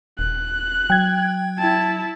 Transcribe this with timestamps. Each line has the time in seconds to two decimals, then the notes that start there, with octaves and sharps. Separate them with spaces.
0.19 D#1 F#6
0.90 F#3 G5 G#6
1.59 E4 A5